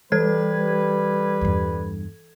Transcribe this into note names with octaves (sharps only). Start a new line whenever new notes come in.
E3 G3 A4 B4 G#6
E2 G2